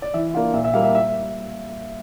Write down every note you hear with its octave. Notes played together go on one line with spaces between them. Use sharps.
D5
E3 E5
A#3 D4 F4 F5
A#2 E5
E5
G3 A#3 F4 F5
E5
E5